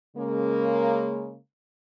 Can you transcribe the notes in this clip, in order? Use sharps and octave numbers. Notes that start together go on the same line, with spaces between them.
C#3 G#3 A#3